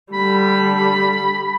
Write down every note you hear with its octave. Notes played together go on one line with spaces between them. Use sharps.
D3 G3 B5